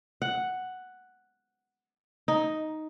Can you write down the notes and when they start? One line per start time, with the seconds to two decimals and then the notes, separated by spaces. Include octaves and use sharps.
0.22 F#5
2.28 D#4